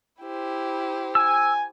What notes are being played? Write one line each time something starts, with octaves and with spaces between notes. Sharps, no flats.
E4 G4 C5
G#5 E6